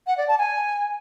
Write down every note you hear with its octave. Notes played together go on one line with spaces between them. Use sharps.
F#5
D5
A5
G#5